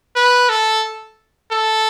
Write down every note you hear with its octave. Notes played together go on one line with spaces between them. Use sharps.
B4
A4
A4